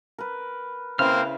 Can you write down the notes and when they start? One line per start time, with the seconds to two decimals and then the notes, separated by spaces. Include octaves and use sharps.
0.18 A#4 B4
0.99 C#3 A#3 C4 E4 B4 C5 F6